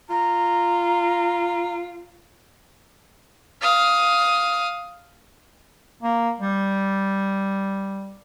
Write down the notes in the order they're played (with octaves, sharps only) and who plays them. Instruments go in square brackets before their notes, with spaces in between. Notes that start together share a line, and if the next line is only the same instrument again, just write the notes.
[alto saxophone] F4 [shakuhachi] A#5
[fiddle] F5 D#6
[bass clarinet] A#3
G3